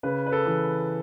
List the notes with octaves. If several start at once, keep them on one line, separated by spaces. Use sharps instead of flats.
C#3 B4
B4
A4
E3